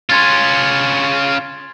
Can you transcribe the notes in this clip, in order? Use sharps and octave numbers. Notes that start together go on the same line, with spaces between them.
C#4 F4 C6 G#6 A6